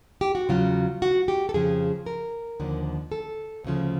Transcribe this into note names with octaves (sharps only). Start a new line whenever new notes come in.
G4
F#4
E2 C#3 F#3 F4
F#4
G4
A4
F2 C#3 F3 G#4
A#4
D#2 D3 F3
A4
D2 C#3 F3